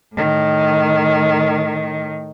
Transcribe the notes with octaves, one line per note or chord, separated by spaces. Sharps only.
A2 D#3